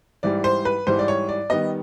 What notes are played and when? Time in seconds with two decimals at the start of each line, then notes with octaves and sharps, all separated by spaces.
0.23 G#2 E3 G3 D5
0.44 C5
0.65 B4
0.87 G#2 E3 G3 C5
0.99 D5
1.08 C#5
1.29 D5
1.50 D#3 G3 B3 D#5